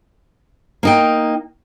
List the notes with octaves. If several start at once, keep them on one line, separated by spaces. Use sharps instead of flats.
A#3 D#4 G5